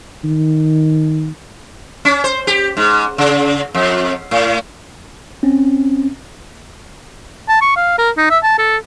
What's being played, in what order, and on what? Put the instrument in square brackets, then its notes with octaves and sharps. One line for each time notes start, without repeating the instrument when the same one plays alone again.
[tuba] D#3
[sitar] C#4
C5
G4
G#2
C#3
F2
A2
[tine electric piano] C4 C#4
[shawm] A5
C#6
F5
A#4
D#4
E5
A5
A4